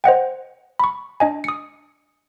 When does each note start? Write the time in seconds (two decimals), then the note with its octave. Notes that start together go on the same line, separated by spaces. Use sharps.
0.04 C5 D#5 F#5 G5
0.79 B5 C#6
1.20 D4 D#5 G#5
1.44 D#6 C#7